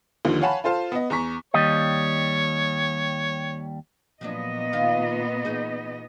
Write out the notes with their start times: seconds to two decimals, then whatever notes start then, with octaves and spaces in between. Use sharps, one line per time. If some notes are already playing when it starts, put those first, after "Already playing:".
0.25 D#2 D3 D#3 F3
0.41 C#5 F5 F#5 G#5 A5 B5
0.64 F4 A4 C5 F5 A5
0.92 B3 D#5
1.10 E2 A#5 C#6 B6
1.54 D#2 G3 C#5 D#5
4.21 A#2 F3 F#3 B3 D4 D#5
4.73 D#3 F4 F5
5.45 E3 D#4 G#4